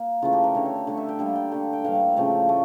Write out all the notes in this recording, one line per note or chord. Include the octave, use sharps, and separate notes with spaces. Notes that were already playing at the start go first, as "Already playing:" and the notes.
Already playing: A#3
C#3 E3 A3 F4
G4
A#4
D3 A3 C#5
C#5
C#5
D3 A3
E5
G5
D3 G3 A#3 F5
G5
D3 A3 G5
G5
A2 E3 G3 A#3 F5
C#3 F3 A3
A3